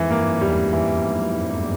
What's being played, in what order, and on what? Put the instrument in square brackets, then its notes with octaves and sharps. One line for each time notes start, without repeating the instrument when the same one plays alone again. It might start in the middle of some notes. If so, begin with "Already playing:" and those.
Already playing: [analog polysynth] F2 G#2 [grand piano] E3
[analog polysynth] G2 [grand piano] A#3
[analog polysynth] F#2
[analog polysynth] E2 [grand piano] G3
[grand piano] E3